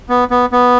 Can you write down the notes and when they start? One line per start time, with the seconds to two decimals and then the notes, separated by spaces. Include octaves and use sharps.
0.09 B3
0.31 B3
0.52 B3